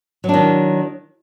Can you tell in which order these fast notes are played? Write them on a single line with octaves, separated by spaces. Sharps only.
F#3 D4 D#3